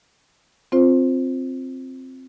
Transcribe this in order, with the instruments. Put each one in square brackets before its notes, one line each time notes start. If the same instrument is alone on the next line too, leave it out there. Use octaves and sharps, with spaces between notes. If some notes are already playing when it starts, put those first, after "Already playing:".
[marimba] C4 F4 C5